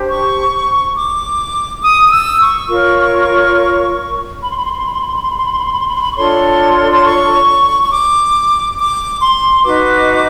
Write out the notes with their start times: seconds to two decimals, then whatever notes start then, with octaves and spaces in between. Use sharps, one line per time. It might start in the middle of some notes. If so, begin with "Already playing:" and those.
Already playing: D4 G4 C5
0.09 C#6
0.95 D6
1.82 D#6
2.07 D#6
2.12 E6
2.41 C#6
2.70 F4 A#4 C#5
4.43 B5
4.51 C6
4.58 B5
4.65 C6
4.72 B5
4.79 C6
4.87 B5
4.93 C6
5.00 B5
5.08 C6
5.16 B5
5.22 C6
5.30 B5
5.37 C6
5.44 B5
5.52 C6
5.59 B5
5.66 C6
5.72 B5
5.80 C6
5.87 B5
5.95 C6
6.01 B5
6.12 C#6
6.16 D4 F4 A4 C#5 C6
6.92 C6
7.04 C#6
7.83 C#6
7.90 D6
8.78 D6
9.21 C6
9.64 D#4 F#4 B4 D6